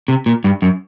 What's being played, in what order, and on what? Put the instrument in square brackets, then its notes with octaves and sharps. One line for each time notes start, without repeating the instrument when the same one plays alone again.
[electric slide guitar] C3
A#2
G2
F#2